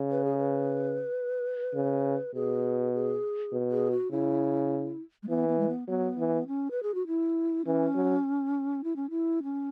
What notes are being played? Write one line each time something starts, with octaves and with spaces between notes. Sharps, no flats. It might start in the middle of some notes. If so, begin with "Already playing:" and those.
Already playing: C#3
B4
G#4
B4
C#3
B2 G#4
G#4
B2
G#4
F#4
C#3 E4
G#3
E3 B3
B3
G#3
B3
F#3 B3
E3
C#4
B4
G#4
F#4
E4
E3 C#4
F#3
E4
C#4
E4
C#4